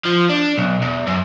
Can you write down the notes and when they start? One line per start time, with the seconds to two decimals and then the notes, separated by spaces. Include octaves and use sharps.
0.05 F3
0.29 D4
0.58 B1
0.82 E2
1.07 F#2